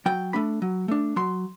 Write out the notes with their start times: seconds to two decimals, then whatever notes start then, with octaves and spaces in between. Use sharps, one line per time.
0.06 F#3 G5
0.33 A3 D4 B5
0.62 F#3
0.88 A3 D4
1.16 F#3 C6